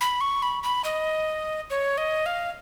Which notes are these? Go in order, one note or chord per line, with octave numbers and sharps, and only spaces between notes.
B5
C#6
B5
B5
D#5
C#5
D#5
F5